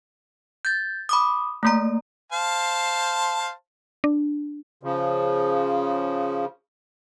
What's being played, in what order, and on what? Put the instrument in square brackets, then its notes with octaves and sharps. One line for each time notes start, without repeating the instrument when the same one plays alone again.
[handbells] G6 A6
B5 D6 D#6
A3 A#3 A#5
[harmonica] C5 F5 A5
[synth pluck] D4
[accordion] C#3 F3